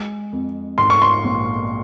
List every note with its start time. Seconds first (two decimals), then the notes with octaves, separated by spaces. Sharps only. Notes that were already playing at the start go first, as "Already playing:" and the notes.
Already playing: G#3
0.32 F2
0.78 G#2 C6
0.90 C#6
1.02 C6
1.24 A#1